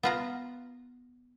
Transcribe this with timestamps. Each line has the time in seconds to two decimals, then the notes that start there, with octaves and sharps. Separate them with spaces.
0.03 B3 F4 A#5